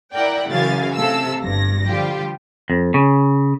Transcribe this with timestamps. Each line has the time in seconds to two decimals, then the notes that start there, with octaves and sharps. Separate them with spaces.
0.14 E4 A#4 D5 F#5 G5
0.49 F#2 C#3 E3 F5 G#5 A6
0.96 C3 A3 A4 F5 E6
1.43 G1 G2 A#6
1.88 D3 F3 G3 F4 G4
2.70 F2
2.94 C#3